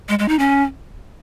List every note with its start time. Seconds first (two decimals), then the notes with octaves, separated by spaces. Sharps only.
0.09 G#3
0.19 G#3
0.28 D#4
0.39 C#4